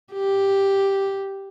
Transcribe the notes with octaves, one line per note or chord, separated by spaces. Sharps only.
G4